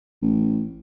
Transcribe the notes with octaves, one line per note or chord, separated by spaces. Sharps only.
A1